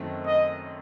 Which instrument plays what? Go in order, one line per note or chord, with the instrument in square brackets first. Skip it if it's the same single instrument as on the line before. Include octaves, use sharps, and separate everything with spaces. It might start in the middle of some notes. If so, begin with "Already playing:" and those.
Already playing: [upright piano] F#1 F#2 D#3 A3 C4
[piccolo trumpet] D#5